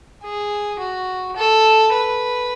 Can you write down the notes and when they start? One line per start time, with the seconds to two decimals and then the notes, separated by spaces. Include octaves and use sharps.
0.23 G#4
0.80 F#4
1.36 A4
1.93 B4